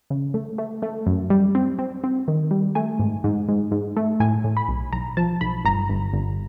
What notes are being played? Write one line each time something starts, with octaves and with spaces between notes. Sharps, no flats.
C#3
A3
A3
A3
F#2
G3
C4
C4
C4
D#3
G3
A3 G#5
G#2
G#2
G#2
G#2
A3
A2 G#5
A2
B5
B1
B1 A#5
F3 A5
B1 B5
G1 A#5
G1
G1